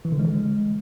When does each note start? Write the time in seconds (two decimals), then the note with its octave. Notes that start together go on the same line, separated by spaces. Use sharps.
0.05 E3
0.12 D3
0.19 G#3